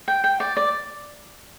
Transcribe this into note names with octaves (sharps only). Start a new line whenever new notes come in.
G5
G5
D5
D5